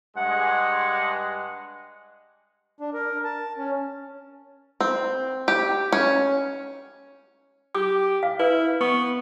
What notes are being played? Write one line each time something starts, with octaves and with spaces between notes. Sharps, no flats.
G2 G#3 F#5
D4
A#4
A5
C#4
C4
G4
C#4
G4 D6
F5
E4 B4
B3 C#6